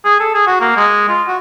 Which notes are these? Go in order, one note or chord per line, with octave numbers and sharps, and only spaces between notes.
G#4
A4
G#4
F#4
A#3
G#3
F4
F#4